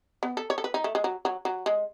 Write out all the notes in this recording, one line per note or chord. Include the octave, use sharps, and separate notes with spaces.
B3
A4
C#5
A4
B4
D#4
A3
G#3
F#3
F#3
F#3
G#3